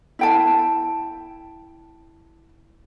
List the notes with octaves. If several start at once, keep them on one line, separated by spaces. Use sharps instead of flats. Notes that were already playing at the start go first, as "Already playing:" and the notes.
E4 G5 A5